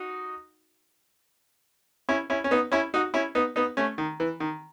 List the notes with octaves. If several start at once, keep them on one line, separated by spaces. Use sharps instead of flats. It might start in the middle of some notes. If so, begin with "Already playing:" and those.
Already playing: D#4 F#4
C#4 E4
C#4 E4
C#4
B3 D#4
C#4 E4
D#4 F#4
C#4 E4
B3 D#4
B3 D#4
A3 C#4
D#3
E3
D#3